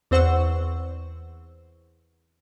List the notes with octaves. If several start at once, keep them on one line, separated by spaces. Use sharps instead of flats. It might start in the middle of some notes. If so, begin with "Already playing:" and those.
E2 C4 C5 F#5 C#6 E6